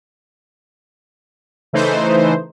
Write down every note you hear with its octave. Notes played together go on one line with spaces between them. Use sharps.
C#3 E3 A3 D#4 C5